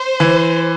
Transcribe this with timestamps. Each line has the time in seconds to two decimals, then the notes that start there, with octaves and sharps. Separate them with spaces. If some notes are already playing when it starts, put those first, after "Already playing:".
Already playing: C5
0.20 E3